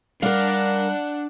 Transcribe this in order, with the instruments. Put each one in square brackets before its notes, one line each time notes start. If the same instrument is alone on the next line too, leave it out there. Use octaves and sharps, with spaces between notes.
[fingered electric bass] G3 [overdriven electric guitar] D4 D5 [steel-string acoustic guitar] A#4 F5 [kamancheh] F#5